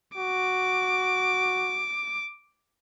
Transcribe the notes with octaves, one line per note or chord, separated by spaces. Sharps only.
F#4 D6